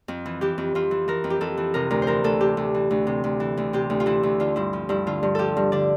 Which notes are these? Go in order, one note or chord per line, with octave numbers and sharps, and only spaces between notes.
F2
E3
E3 G4
F2
F2 F4
E3
E3 A#4
F2
G4
F2 A4
E3
C3 A#4
D2 A#4
C5
E3 A#4
D2 A4
C3 G4
D2
E3
D2
C3
D2
E3
D2
C3 G4
D2
F4
E3 E4
D2
D3 F4
G2 E4
F3
G2 E4
D3 F4
G2
F3 G4 A4
G2
D3 D5